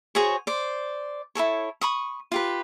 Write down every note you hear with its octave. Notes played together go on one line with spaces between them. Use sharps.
F#4 G#4 C5 C#5
C5 D5
E4 G4 A4 C#5
B5 C#6 D#6
F4 G4 B4